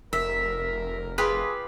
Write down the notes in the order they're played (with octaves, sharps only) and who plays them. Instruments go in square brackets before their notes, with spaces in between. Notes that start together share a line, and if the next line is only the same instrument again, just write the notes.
[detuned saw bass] F1 [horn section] A#4 [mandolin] E5
[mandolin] F4 G4 B4 [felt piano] G#4